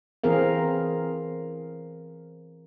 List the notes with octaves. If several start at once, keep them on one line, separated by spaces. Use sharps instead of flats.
E3 C4 G#4 A#4 F5